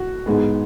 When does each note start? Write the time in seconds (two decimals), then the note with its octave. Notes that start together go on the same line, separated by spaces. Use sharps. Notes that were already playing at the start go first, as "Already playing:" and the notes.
Already playing: F#4
0.26 G#2 G#3 B3